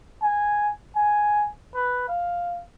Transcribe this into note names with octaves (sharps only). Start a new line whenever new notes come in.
G#5
G#5
B4
F5